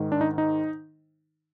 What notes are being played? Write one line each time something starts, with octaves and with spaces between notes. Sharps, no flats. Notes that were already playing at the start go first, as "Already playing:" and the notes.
Already playing: G#2 D#3
D4
D#4
D#4